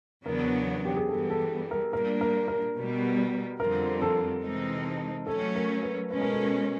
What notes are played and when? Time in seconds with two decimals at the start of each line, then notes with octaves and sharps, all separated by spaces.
0.25 E2 C#3 F#3 B3 D4 A#4
0.85 G4
0.97 G#4
1.09 G2 E3 G3 B3 A4
1.30 A4
1.71 A#4
1.93 A#2 G3 A#3 D4 A#4
2.21 A#4
2.48 A#4
2.77 B2 G3 B3
3.60 F2 D3 G3 C4 F4 A#4
4.02 A4
4.43 C3 E3 G#3 C4 D#4
5.27 F#3 A3 C#4 A4
5.55 A#4
5.83 B4
6.10 B2 G#3 C#4 B4
6.21 A#4
6.32 A4
6.42 A#4